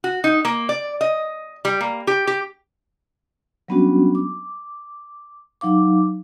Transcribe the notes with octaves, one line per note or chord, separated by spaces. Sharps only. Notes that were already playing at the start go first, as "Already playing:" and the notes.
F#4
D#4
A#3
D5
D#5
G3
A#3
G4
G4
F#3 G3 B3 C#4 D4 F#4
D6
F#3 D#4 F5 D6